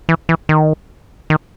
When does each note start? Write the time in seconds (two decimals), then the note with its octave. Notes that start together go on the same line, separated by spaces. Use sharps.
0.09 E3
0.29 E3
0.49 D#3
1.30 D#3